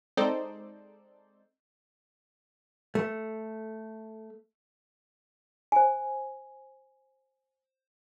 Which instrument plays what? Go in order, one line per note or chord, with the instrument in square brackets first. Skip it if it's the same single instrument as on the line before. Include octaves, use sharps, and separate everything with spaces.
[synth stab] G#3 C4 D#4 A4 C5 D5
[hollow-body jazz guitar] A3
[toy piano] C5 G#5